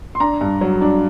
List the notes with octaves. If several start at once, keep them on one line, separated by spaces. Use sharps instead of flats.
C6
D4 A#5
G2
F#3
D4